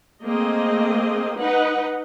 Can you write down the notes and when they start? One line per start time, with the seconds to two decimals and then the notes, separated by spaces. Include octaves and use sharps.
0.24 A3 A#3 C4 G#4 D#5
1.39 D#4 B4 D#5 F#5